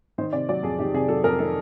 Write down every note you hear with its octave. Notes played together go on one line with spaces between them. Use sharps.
D#3 C5
C3 D5
F#3 D5
F2 G#4
D#3 G4
C3 G#4
F#3 A4
F2 A#4
D#3 A4